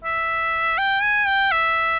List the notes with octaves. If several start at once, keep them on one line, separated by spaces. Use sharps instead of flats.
E5
G5
G#5
G5
E5